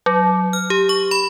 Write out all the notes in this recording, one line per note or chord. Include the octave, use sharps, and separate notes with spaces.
F#3
F6
G4
C#6
B5